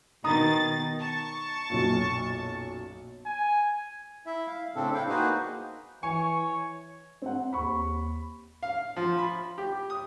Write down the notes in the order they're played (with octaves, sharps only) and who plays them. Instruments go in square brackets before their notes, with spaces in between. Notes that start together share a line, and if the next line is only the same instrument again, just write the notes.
[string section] B2 D#3 A6 [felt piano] D#4 A#5 D#6
[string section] A5 C#6
[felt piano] B1 F#2 A#2
[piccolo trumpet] G#5
[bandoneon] E4 E5
F5
A2 C#3 C4 D4 A4
D4 E4 F5 G5
A#3 D#4 F#4 G#4 B4 C5
[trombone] E3 [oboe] C#5 [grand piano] G#5 [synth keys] C#6
[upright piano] C4 F#5
[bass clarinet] D#2 [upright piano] B5 C#6
[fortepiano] F5
F3
B5
G4
D#6